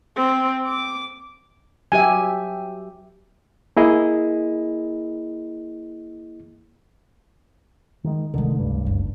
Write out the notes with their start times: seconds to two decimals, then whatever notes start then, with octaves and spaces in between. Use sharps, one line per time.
0.16 C4
0.67 D6
1.92 F#3 G4 E5 G#5
3.77 A#3 E4 G#4 D#5
8.04 D#3 G#3
8.34 F1 D3 D#3 G#3
8.59 C#2 G2
8.86 F#1